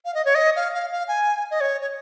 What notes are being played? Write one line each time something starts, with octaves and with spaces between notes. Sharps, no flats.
F5
D#5
C#5
D#5
F5
F5
F5
G#5
D#5
C#5
C#5